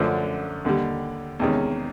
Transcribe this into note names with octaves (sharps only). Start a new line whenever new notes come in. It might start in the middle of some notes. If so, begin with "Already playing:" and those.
Already playing: F#2 D3 F3 A3 D4
D#2 D3 G3
E2 C3 D#3 G#3 C#4